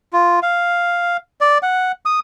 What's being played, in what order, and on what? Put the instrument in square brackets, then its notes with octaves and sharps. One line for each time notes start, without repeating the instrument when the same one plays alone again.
[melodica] F4
F5
D5
F#5
D#6